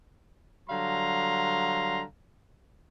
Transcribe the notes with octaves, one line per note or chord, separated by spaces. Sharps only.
D3 F#3 G3 F5 A#5 C6